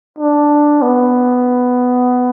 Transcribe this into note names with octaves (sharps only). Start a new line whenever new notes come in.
D4
B3